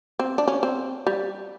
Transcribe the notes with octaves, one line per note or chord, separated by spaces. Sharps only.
C4
D4
C#4
C4
G3